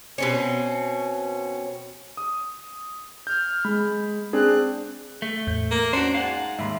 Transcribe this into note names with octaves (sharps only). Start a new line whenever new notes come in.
B2 C4 C#4
D#6
F6 G6
G#3 B5
C4 D4 G#4 F#6
A3
E2 A2 G6
A#3
C#4 D4 F#4 C5 C#7
G#2 F5 F#5
D#2 G#2 E5 B5 C6